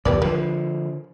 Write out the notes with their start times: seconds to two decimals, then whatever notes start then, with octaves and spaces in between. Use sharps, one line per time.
0.05 D#1 B1 F2 G4 B4 D5
0.22 D3 F3 B4